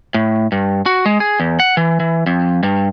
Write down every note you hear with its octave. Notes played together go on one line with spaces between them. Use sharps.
A2
G2
F#4
G#3
G#4
E2
F#5
E3
E3
F2
G2